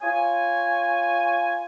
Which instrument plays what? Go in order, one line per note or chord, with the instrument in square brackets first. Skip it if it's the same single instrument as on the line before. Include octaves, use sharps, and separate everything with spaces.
[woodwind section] F4 C#5 G#5